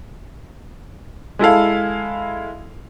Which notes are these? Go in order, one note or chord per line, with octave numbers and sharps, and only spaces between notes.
G#3 E4 A4 F5